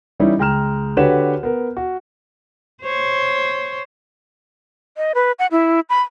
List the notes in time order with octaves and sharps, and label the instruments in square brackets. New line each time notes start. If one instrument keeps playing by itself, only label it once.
[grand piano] E3 G3 C#4 D#4 E4
C#2 G#3 G5 A#5 F6 E7
D3 F#4 G4 B4 C#5 E7
B3 A#4
F#4
[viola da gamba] C5 C#5
[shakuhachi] D#5
B4
F#5
E4
B5